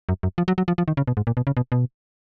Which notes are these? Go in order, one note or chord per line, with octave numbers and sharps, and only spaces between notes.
F#2
F#2
F3
F#3
F#3
F3
F3
D#3
C#3
B2
G#2
A#2
B2
C#3
B2
B2